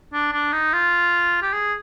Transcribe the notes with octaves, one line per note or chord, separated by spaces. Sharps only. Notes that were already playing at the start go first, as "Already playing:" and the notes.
D4
D4
D#4
F4
G4
G#4